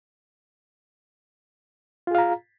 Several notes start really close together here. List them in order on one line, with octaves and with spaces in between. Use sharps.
F4 G#4 F5 A#5